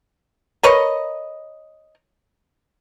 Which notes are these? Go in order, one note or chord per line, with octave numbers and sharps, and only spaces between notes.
A#4 B4 C#5 D#5